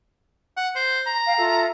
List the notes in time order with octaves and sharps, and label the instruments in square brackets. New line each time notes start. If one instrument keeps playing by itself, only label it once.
[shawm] F#5
C5
A#5
[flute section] F5 G5
F4 A4 E5